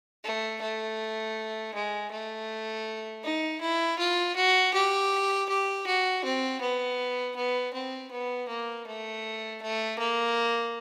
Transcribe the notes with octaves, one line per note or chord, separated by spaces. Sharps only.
A3
A3
G#3
A3
D#4
E4
F4
F#4
G4
G4
F#4
C4
B3
B3
C4
B3
A#3
A3
A3
A#3